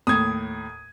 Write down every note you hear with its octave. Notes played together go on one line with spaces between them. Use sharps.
D#2 A2 D#6 G#6